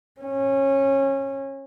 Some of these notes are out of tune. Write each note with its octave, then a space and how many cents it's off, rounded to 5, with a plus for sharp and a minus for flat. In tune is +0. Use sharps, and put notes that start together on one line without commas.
C#4 -20